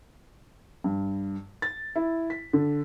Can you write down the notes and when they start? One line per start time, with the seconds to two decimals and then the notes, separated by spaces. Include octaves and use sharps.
0.84 G2
1.62 A6
1.96 E4
2.30 B6
2.53 D3